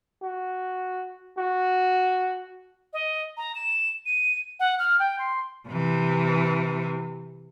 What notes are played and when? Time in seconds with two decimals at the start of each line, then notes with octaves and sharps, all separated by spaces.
0.22 F#4
1.38 F#4
2.93 D#5
3.37 A#5
3.55 E7
4.06 D#7
4.60 F#5
4.79 F6
4.99 G5
5.19 C6
5.69 C3 E3